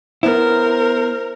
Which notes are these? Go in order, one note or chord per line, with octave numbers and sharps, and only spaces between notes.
B3 E4 A#4 C5